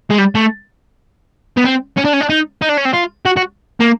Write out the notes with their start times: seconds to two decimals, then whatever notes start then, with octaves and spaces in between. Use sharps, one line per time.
0.10 G#3
0.18 G3
0.35 A3
1.57 B3
1.64 C4
1.97 C#4
2.05 D4
2.13 C#4
2.21 D4
2.30 D#4
2.62 D#4
2.69 D4
2.78 C#4
2.85 C4
2.94 F4
3.26 F#4
3.37 F#4
3.80 A#3